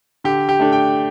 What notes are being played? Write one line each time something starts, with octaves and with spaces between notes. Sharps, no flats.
D3 G4
G4
A3 D4
G5